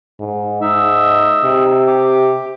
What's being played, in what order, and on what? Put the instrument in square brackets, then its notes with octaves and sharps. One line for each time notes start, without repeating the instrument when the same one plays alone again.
[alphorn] G#2
[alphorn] G#2 [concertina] D#4 E5
[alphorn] C3
[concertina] G4 D6